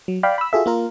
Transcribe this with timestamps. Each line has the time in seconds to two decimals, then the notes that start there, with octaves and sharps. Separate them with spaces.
0.08 F#3
0.23 D5 F5 G5 B5
0.38 B5 E6
0.53 F4 F#4 G#4 A4 E5
0.66 A#3 F4 A#4